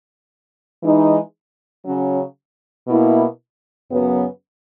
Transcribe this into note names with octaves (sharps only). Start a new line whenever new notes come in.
E3 G#3 D#4
C#3 F#3 C#4
B2 A#3 E4
F#2 C#3 F#3 B3